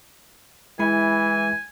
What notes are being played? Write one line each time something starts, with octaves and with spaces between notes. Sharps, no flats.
E3 G#3 E4 G#5 B5